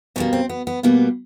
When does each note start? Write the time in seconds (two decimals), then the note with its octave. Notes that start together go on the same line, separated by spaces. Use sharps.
0.16 B2 G3 A#3 C#4
0.33 C4
0.49 B3
0.67 B3
0.83 B2 G3 A#3 B3